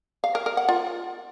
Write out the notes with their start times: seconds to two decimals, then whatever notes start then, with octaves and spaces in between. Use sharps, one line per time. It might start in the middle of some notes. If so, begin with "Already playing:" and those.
0.24 F5
0.35 A#4
0.46 A#4
0.57 F#5
0.69 F4